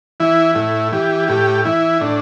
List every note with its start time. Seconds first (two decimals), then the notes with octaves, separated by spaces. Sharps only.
0.20 E3 E4
0.55 A2 E4
0.92 E3 G4
1.28 A2 G4
1.65 E3 E4
2.01 A2 D4